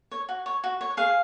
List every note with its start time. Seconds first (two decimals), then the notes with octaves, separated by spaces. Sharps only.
0.12 C#5
0.29 F#4
0.46 C#5
0.64 F#4
0.81 C#5
0.97 G#4 F5